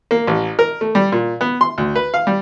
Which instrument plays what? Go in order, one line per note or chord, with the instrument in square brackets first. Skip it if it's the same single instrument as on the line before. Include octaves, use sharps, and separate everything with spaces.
[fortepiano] A#3
A1
A#4
A3
G3
A#2
B3
C6
D2
B4
F5
G3